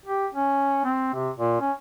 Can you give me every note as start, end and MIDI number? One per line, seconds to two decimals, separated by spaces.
0.06 0.27 67
0.34 0.80 61
0.85 1.12 60
1.14 1.31 48
1.38 1.59 46
1.61 1.72 61